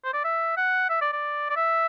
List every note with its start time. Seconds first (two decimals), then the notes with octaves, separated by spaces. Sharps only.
0.04 C5
0.14 D5
0.24 E5
0.57 F#5
0.90 E5
1.01 D5
1.13 D5
1.50 D5
1.56 E5